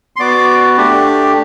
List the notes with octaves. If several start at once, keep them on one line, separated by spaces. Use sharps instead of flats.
C6
B3 F#4 D5 D6
A3 D4 G4